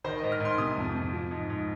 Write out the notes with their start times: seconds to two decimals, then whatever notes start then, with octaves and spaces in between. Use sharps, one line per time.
0.04 D#3 C5
0.18 D#5
0.23 G#2
0.32 F6
0.40 G#2 C6
0.58 C3 D#6
0.78 F2
0.95 F2
1.13 F3
1.31 G#2
1.50 G#2